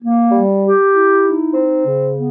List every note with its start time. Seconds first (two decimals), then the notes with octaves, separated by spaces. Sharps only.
0.02 A#3
0.32 G3
0.62 G4
0.93 E4
1.23 D#4
1.54 C4
1.85 C#3
2.14 B3